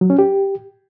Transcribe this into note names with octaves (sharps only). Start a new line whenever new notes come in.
F#3
C#4
G4